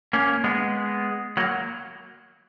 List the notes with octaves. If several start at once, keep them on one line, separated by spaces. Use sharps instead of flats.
A#3 C#4
G#3 B3
F#3 A#3